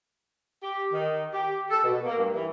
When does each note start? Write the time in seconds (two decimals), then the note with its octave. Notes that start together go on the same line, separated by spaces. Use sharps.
0.61 G4
0.92 D#3
1.33 G4
1.70 A4
1.82 B2
2.04 A#3
2.17 G2
2.33 E3